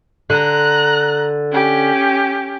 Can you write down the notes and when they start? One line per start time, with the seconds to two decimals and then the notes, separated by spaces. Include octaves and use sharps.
0.30 D3 A#5 F#6
1.52 C#4 G4